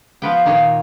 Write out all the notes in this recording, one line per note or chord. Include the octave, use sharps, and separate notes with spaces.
F3 B3 G5
A#2 D#3 C#5